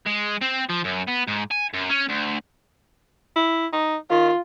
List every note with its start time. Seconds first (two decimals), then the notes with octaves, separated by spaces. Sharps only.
0.06 G#3
0.41 C4
0.70 F3
0.85 F#2
1.08 B3
1.28 G#2
1.51 G#5
1.74 F#2
1.89 C#4
2.09 D2
3.36 E4
3.73 D#4
4.11 D#3 F4